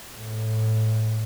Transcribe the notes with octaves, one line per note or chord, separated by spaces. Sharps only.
A2